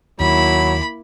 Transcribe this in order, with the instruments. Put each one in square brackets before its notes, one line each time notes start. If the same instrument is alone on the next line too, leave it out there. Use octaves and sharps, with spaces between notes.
[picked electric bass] D#2 [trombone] F#3 [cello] A#3 E4 [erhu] B5